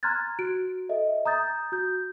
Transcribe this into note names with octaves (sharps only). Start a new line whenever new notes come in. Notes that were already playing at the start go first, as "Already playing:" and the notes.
A#5 C6 F6 F#6 G#6 A6
F#4 D7
A4 D#5 E5
A#5 D#6 G6 A6
F#4 G6